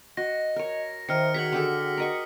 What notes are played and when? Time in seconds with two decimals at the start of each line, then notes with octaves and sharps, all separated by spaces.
0.17 F#4 D#5 A#6
0.56 A#4 C#5
1.09 D#3 A#4 C5 E5 F6 C#7
1.34 F#4 G#4 C#5 F#5 A#5 B6 F#7
1.52 D3 G4 A4
1.97 A#4 D#5 C#6